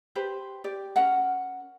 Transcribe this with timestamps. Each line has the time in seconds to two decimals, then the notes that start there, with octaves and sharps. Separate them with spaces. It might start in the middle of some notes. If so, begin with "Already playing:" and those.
0.15 G4 B4 C5
0.64 G4 D5
0.96 C#4 A#4 F#5